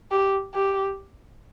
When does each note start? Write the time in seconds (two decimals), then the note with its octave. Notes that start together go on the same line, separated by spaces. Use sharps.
0.12 G4
0.54 G4